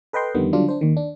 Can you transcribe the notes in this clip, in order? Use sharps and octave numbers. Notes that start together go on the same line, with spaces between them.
A4 B4 D#5 G5 C6
F2 D3 D#3 G3 B3
D3 F#3 G3 D4 F4
D4 C5
D#2 D#3
D4